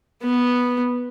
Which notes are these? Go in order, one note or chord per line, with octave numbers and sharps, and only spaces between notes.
B3